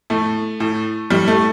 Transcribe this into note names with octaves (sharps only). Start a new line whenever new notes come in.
A2 A3
A2
A2 G3
A3